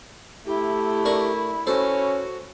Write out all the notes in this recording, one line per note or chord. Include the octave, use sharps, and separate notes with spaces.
A3 E4 G4
D4 A#4 C#6
C#4 F#4 A4 C5